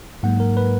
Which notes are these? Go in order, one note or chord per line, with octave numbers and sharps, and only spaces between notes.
G#2 F#3 A#3 F#5
A#4
B4